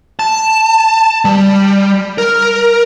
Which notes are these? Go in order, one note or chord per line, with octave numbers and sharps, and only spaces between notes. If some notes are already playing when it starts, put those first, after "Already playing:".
A5
G3
A#4